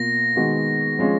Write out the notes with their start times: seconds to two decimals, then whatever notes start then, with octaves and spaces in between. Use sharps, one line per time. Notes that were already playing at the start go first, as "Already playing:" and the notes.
Already playing: B2 A#3 F4 A#6
0.36 D#3 G#3 B3 F#4
0.99 F3 G#3 C#4